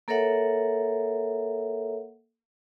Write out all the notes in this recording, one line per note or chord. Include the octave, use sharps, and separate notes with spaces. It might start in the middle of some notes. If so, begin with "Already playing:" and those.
A#3 A4 A#4 C#5 E5 F#5